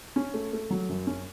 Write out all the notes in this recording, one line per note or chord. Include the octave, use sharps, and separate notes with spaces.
C#4
A3
A3
F#3
F#2
C#4